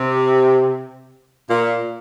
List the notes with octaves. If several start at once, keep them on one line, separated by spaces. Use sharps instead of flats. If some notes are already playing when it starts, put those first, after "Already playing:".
Already playing: C3
A#2